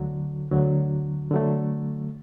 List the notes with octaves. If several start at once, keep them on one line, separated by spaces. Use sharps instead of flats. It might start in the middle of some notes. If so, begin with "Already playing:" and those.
Already playing: D2 D3 F#3
D2 D3 F#3
D3 F#3 A3